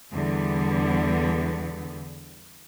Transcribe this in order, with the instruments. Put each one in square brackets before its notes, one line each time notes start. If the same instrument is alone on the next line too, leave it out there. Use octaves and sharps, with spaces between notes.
[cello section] E2 D3 G3 B3